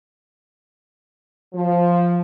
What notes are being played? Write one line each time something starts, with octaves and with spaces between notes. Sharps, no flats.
F3